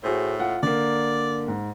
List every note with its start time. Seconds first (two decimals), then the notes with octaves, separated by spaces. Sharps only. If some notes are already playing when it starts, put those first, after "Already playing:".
0.04 A2 F#4 G#4 C5
0.40 F4 F#5
0.63 D3 A#3 D5
1.48 G#2